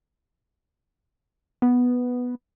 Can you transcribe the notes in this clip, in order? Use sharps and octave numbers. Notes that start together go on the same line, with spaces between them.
B3